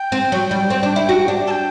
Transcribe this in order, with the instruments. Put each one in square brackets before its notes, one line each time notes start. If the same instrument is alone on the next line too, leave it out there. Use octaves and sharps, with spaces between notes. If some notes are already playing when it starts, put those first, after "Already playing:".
Already playing: [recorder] G5
[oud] C4
F#3
G3
C4
D4
E4
F#4
D4
[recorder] A5
G5